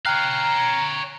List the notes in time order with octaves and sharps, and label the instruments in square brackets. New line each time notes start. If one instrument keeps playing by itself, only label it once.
[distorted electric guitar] C#5 F5 [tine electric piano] G5 F6 F#6 [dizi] A#5